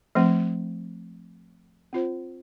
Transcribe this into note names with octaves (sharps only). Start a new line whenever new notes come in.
F3 A3 C4
C4 F4 C5